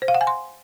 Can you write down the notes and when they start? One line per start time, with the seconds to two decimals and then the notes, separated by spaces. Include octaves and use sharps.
0.02 C5
0.08 F5
0.15 F#5
0.21 G#5
0.27 C6